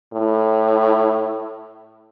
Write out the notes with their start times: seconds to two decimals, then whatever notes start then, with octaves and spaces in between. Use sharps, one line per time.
0.14 A2